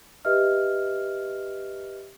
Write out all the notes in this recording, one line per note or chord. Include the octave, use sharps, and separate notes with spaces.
G4 B4 D#5 E5 F6